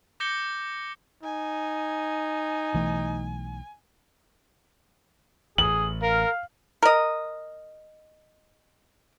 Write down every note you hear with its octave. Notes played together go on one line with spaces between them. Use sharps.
D6 G6 A#6 C#7 G7
D#4 G#5
B1 E3 A3
A1 G#4 F#7
A#4 F5
A#4 D#5